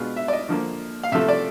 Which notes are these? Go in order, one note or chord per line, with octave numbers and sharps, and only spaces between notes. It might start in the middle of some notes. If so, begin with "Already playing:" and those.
Already playing: B2 G#3 B3 D4 F4
E5
D5
D#5
D3 F3 A#3
F5
C3 F3 A3 E5
D5